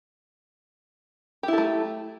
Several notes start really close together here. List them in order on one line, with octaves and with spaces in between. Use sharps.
G4 E4 A4 A3